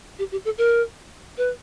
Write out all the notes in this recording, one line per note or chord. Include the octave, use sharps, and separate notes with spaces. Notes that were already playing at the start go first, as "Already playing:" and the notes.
G4
G4
A4
A#4
B4